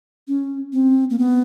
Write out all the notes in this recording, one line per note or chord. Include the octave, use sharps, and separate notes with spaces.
C#4
C4
A#3
B3